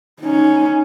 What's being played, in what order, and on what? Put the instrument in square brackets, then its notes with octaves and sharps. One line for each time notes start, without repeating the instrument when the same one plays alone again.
[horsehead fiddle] C#4 D#4